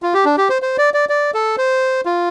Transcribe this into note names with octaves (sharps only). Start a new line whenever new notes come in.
F4
G4
D4
G4
C5
C5
D5
D5
D5
A4
C5
F4